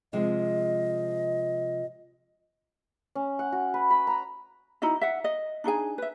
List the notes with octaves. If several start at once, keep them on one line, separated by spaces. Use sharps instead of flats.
C3 F3 G#3 D#5
C#4
F#5
F#4
B4
B5
A#5
D#4 E4 F#4 D#5
E5 F#5
D#5
D4 D#4 G#4 G#5
B4 E5